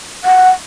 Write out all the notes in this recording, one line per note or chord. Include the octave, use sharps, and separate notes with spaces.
F#5